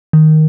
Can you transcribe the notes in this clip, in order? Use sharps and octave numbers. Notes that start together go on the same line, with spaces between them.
D#3